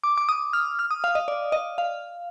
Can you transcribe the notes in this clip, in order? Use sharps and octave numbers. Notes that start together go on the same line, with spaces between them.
D6
D6
D#6
F6
F6
D#6
F5
D#5
D5
D#5
F5